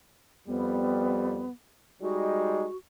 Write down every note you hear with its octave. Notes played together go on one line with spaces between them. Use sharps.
F2 G3 B3
G3 G#3 D#4 F#4